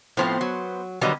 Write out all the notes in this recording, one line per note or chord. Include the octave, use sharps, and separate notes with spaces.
A2 F3 B3 C4 C5
F#3
D3 D#3 F#3 G3 B3 D#5